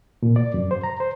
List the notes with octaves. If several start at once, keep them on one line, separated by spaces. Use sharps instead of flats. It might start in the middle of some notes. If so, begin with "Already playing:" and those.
A#2
D5
F#2
C5
A#5
C5